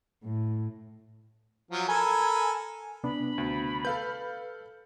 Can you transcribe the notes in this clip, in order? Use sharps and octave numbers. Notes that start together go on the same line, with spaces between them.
A2
F3 F#3
A4 A#4 G#5 B5
C3 B3 D4 B5
D2
A4 B4 F5 G6